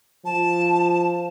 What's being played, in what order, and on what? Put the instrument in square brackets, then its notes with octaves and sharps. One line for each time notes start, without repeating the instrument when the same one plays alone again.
[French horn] F3 [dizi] A5